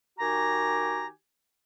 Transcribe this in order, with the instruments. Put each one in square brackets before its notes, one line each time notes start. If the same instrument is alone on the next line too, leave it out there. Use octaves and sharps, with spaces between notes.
[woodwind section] D#3 F#4 G4 G#5 A#5